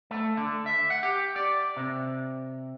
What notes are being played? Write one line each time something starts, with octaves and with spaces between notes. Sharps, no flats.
A3
D3
E5
F#5
G4
D5
C3